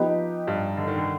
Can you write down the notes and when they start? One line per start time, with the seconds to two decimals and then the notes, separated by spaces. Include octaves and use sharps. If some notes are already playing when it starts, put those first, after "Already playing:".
Already playing: F3 B3 D#4 G4 B4
0.47 G2 G3
0.78 D3
0.88 D#3
0.98 D3